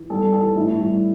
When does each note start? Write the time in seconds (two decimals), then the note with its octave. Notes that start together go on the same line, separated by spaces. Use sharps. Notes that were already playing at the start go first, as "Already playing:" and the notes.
Already playing: E3
0.10 G3 A4
0.32 E3 A4
0.56 A2 E4
0.79 G3